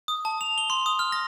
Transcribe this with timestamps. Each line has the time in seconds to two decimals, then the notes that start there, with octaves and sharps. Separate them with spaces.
0.08 D#6
0.25 A5
0.41 F7
0.58 G7
0.70 C6
0.86 D#6
0.99 F6
1.12 A#6